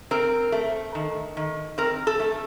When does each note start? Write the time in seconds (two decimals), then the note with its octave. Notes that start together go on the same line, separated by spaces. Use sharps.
0.11 C4 A#4
0.52 A3
0.95 D#3
1.37 D#3
1.78 C4 A#4
2.07 A4
2.20 A3